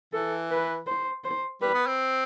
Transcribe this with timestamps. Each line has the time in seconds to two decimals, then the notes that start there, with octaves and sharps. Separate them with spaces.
0.13 E3 A4
0.50 B4
0.87 C5
1.24 C5
1.61 G3 B4
1.74 B3
1.87 C4